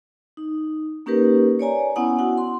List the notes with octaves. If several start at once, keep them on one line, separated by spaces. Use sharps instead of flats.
D#4
A#3 C#4 D#4 G4 A#4 B4
C#5 D5 G#5 A#5
B3 C#4 E4 F#5 G#5 D#6
E4 F#4 F#5
C6